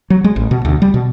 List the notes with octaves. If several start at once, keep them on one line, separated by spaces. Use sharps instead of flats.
F#3
G#3
A1
B2
D2
G3
B2